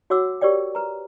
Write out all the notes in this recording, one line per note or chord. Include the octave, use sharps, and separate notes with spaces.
F#4 C#5 F#5 D6 E6
G4 A#4 C#5 D5 G5
B4 A#5